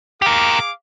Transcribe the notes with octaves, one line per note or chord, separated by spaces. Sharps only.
G4 G#4 A#4 F5 D6